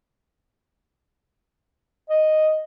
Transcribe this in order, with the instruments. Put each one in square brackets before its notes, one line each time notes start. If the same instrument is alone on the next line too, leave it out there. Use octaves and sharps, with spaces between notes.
[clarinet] D#5